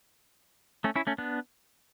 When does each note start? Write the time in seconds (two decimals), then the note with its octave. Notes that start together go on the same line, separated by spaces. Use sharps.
0.84 A3 C#4
0.96 C#4 E4
1.07 A3 C#4
1.18 B3 D4